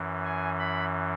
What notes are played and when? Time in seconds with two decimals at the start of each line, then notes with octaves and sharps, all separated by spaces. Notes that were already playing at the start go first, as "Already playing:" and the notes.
Already playing: F#2 E3
0.25 G#5
0.59 B5